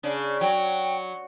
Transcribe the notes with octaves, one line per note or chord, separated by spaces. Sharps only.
C#3 D4
F#3 G5